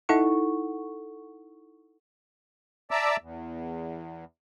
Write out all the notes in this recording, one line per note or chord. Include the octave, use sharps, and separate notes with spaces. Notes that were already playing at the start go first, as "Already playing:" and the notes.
D#4 E4 A4 F#5 C#6
D5 E5 A5 A#5 D6 E6
E2